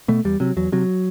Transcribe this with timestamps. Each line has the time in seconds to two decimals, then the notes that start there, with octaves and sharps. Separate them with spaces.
0.08 B2 A3
0.25 E2 G3
0.40 C3 F#3
0.57 E2 F#3
0.72 C3 F#3